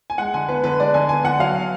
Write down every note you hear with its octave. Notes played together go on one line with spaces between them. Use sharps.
G#5
G#3 F#5
D3 G#5
B3 B4
D3 B4
G#3 D5
D3 G#5
B3 G#5
D3 F#5
F#3 F5